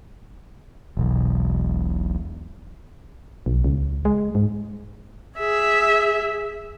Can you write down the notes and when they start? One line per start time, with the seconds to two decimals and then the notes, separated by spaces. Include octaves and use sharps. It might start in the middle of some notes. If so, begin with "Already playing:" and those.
0.97 E1 B1
3.46 B1
3.64 C#2
4.05 G#3
4.35 G#2
5.38 G#4 E5